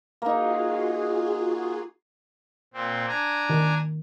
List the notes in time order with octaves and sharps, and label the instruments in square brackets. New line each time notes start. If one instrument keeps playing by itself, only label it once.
[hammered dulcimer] A#3 D#4 [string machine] F4 F#4 G#4
[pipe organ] A#2 C4
D4 G#5 A#5
[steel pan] D#3